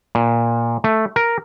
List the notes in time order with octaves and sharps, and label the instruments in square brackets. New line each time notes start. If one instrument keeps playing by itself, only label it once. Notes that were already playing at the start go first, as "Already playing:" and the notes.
[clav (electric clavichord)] A#2
A3
A#4